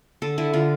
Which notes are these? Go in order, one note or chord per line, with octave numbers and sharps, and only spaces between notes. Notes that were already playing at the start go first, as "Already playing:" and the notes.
D3 A4
D3 E4
D3 F4